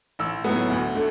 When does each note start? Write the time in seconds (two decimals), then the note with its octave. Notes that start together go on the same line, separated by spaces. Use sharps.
0.19 A1 E6
0.44 A2 F#3 B3
0.70 D2
0.95 D3 A3